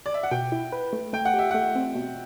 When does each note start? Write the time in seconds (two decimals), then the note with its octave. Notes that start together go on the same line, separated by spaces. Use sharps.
0.06 D5
0.14 E5
0.23 F#5
0.31 B2 G5
0.52 E4
0.72 B4
0.93 A3
1.13 A3 G5
1.25 F#5
1.34 G4 E5
1.51 A3 F#5
1.75 C4
1.95 B2